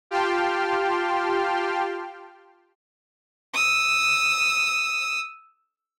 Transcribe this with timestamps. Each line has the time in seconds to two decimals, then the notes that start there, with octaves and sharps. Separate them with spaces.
0.11 F4 G4 G5 A5 C6 F6
3.54 D#6 E6